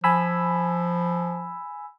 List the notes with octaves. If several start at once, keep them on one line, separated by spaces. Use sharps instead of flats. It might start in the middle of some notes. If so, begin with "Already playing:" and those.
F3 G#5 B5 E6